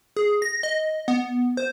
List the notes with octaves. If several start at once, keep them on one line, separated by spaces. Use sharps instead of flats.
G#4
A#6
D#5
B3
C5